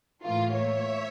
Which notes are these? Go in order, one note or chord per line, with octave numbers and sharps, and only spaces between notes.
A2 E3 A#3 F4
C#5 E5